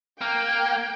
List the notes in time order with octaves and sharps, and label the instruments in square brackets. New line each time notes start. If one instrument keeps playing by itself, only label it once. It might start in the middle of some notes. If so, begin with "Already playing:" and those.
[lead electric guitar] A#3 [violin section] G5